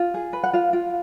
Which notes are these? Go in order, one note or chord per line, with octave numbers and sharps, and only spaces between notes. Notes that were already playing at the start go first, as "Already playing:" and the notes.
Already playing: F4
G#4
B4
F#5
F4 F5
F4